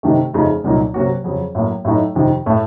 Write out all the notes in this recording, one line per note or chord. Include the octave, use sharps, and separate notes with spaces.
C3 D#3 A3
F2 C#3 A3 D#4
C2 A#2 F#3 A#3 D#4
C3 F#3 A#3 C#4 F#4
F2 C#3 F#3
A2 F#3 A#3
A2 F#3 A3 D#4
F2 C3 D#3
A2 A3